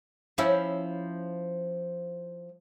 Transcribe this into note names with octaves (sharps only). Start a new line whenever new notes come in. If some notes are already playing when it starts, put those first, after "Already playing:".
F3 C#4 E4